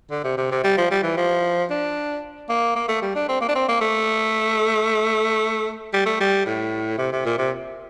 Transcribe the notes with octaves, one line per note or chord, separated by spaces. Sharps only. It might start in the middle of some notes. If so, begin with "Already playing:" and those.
D3
C3
C3
C3
G3
F3
G3
E3
F3
D4
A#3
A#3
A3
G3
D4
C4
A#3
D4
C4
A#3
A3
G3
A3
G3
A2
C3
C3
A#2
C3